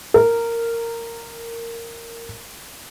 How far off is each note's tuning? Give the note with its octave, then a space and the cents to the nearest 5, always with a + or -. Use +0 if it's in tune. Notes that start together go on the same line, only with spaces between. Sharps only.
A#4 -10